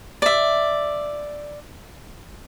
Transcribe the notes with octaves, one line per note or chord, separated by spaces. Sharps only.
D5 E5